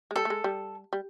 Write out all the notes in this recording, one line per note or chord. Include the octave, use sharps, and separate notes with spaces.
G#3
G3 A4
A3
G#3
G3
G3